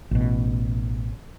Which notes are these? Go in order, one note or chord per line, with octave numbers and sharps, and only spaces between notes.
A1 B2